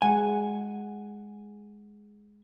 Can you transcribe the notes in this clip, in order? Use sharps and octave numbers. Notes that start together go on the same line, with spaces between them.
G#3 F#5 G#5